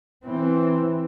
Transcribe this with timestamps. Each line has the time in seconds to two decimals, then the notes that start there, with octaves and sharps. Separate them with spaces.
0.24 E3 C4